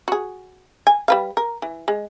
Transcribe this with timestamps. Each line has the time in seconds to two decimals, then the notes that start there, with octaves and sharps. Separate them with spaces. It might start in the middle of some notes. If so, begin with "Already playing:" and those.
0.08 F#4 G#4
0.87 G#5
1.08 G3 B4 F5
1.37 A#4
1.62 E3
1.88 G#3